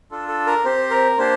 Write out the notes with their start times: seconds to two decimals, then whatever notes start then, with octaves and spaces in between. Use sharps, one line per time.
0.11 D4 F4 A4
0.28 A4
0.47 A#4
0.65 C4 G4 C5
0.90 A#4
1.18 A#3 D4 G4 C5